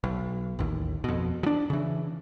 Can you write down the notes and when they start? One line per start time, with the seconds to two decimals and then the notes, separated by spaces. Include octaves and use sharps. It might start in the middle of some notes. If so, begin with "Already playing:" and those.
0.04 B1
0.59 A1 D#2
1.04 F2 B2
1.43 F3 D4
1.70 C#3 E3